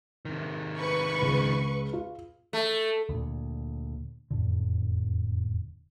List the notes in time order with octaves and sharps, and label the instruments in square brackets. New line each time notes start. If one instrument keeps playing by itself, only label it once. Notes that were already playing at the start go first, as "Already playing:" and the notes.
[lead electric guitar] C3 D#3
[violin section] B4 C#6
[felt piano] C#2
F4
[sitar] A3
[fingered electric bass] D2 A#2
E1 F2 A2 D3